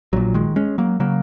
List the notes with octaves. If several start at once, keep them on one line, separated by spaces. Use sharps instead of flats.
A#1 A#2 F#3
D#3 G#3
G#3 C#4
F#3 A#3
C#3 F#3 A#3